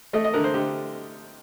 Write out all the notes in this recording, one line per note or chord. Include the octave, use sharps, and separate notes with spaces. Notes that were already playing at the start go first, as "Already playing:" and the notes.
A3 D#5
D#5
D3 A#4
C5
D3 G4